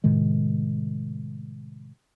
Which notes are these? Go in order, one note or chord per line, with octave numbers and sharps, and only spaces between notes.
A2 C3 D#3 G#3